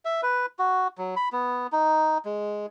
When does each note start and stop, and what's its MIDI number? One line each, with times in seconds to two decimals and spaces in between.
0.05 0.21 76
0.23 0.46 71
0.59 0.88 66
0.98 1.15 54
1.16 1.29 83
1.32 1.67 59
1.72 2.18 63
2.25 2.66 56